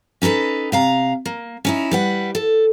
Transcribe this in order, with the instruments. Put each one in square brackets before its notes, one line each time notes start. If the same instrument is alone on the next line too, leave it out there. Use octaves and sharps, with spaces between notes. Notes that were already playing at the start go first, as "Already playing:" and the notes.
[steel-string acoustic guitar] C#4 D#4 A4 B4 A5
C3 F5 A#5
A#3
C#4 D#4 E4
G3 B4 F#5
A4